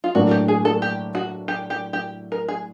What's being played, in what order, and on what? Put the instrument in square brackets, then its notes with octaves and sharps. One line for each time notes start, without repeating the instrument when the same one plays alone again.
[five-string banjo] F4
[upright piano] A2 F#3 A#3 D4 [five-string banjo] F#4
[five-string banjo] G4
G#4
A4
G4
F#4
G4
G4
G4
A#4
G#4